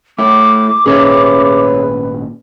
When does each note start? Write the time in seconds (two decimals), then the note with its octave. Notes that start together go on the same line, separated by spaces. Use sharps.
0.18 A3 E4 D6
0.86 G#1 A#2 C#4 G#4 B4 C#5 E5